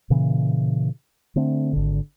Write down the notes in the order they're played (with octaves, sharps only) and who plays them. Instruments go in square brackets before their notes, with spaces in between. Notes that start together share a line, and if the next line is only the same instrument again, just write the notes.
[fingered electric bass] A#2 C#3 E3
D3 A3 C4 D4
G#1 D3